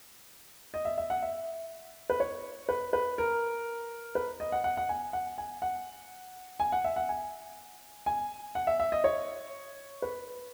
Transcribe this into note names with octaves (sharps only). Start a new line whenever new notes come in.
D#5
E5
E5
F#5
E5
B4
C#5
B4
B4
A#4
B4
D#5
F#5
F#5
F#5
G#5
F#5
G#5
F#5
G#5
F#5
E5
F#5
G#5
G#5
F#5
E5
E5
D#5
C#5
B4